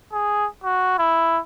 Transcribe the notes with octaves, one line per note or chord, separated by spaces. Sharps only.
G#4
F#4
E4